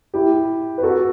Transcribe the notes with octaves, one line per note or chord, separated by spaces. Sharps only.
E4 G4
B4
F#4 A4